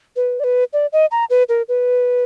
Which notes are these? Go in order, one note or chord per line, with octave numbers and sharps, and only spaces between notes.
B4
D5
B4
D5
D#5
A#5
B4
A#4
B4